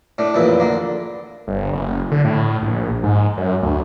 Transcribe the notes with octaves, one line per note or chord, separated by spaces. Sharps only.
A2 A3 D4
A1 F2 A#2 C#3 E4 B4
D3 A#3
G1
F#1
D3
A2
A#1
G#2
F#2
D2